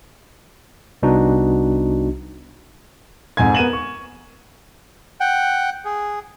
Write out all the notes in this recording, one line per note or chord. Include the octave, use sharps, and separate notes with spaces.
C2 B3 D4 D#4 F#4
F2 G#2 G#5 G#6
B3 A#4 D#7 E7 F#7
C#6
F#5 G5
G#4